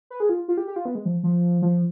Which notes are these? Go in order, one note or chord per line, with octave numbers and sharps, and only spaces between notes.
B4
G#4
F4
F4
G4
G4
F4
B3
G#3
F3
F3
F3